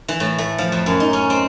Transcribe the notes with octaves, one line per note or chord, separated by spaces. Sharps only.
E3
A2
A3
F3
F2
F#2
D#4
C#4
C4